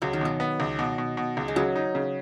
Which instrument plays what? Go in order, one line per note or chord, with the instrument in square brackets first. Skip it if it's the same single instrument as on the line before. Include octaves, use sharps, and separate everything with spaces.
[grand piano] C#2 [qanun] F#3
[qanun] D#3
[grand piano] B2 [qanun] F#3
[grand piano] B3
C#2
B2
B2
B2
C#2
[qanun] G#3
[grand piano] C#3 [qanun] F#3
[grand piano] D#4
C#3